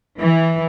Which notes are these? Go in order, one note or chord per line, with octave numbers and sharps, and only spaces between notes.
E3